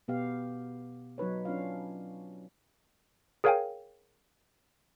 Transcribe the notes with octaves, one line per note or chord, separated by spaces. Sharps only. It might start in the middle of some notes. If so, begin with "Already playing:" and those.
B2 B3 G4 F5
F#3 D#4 B4 C#5
C#4 D4 F4 F5
G#4 A#4 C#5 F5 G5 G#5